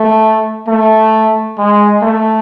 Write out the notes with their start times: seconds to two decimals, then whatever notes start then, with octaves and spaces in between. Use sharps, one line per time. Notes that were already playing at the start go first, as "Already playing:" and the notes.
Already playing: A3
0.68 A3
1.58 G#3
2.02 A3